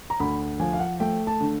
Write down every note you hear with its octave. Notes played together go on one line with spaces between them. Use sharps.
A#5
D2 B5
F3 G#5
F5
F#5
A3 G5
A5
D3